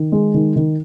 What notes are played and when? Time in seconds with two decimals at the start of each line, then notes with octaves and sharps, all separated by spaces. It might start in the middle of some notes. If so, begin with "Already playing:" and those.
Already playing: D#3
0.12 G#3
0.34 D#3
0.56 D#3